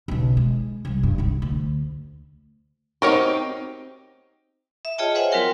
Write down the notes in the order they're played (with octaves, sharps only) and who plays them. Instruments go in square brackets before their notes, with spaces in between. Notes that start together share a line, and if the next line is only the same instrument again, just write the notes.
[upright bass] B1 C#3
G#3
C2 G3
G2
C2 D#4
D2
[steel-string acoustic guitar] C4 D#4 G4 [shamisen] F#4 A#4 C#5
[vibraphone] E5
F4 G#4 C#5 D#5 G5 A5
B4 C5 E5 F#5 G#5
F#3 C4 F4 F#4 A#4 G5